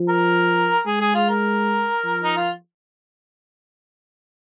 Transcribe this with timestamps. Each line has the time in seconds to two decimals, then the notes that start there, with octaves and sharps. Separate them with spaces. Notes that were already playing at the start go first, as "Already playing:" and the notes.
Already playing: F3
0.09 A#4
0.86 G#3 G#4
1.01 G#4
1.15 F4
1.30 A#4
2.03 F3
2.24 D#4
2.37 F4